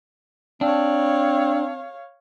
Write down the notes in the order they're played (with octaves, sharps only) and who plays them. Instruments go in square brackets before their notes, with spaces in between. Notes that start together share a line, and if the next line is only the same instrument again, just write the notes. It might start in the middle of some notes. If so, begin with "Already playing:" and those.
[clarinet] C4 [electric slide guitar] D4 [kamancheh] C#5 F5